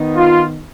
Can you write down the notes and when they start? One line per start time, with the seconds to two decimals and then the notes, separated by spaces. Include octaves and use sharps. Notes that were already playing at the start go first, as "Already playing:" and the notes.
Already playing: D#3 B3 D#4
0.16 F4